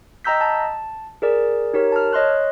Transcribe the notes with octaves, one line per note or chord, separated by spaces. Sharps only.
D#5 G5 A#5 E6 G6 B6
A5
G#4 A#4 D5
D#4 G4 A#4 C#5
A5 F6
C#5 D#5 C6 F#6